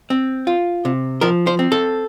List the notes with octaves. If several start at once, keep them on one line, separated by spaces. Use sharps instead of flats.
C4
F4
C3
F3 A#4
C5
C4
A4